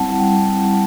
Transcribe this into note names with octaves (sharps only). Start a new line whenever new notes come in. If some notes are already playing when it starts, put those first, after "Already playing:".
Already playing: G3 C4 E4 F#5 A5
G3